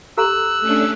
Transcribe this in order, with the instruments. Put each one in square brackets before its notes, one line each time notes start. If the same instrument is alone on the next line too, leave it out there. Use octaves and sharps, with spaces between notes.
[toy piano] G4 A4 A#5 [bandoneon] E6 [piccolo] F#6
[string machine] A3 C#4 D4